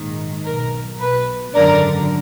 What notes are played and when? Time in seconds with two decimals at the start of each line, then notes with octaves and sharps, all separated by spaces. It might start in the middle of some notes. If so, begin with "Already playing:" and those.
Already playing: A#1 G#2 D#3
0.45 B1 B2 A#4
0.99 B1 B2 B4
1.55 G#1 F#2 D3 A#4 D5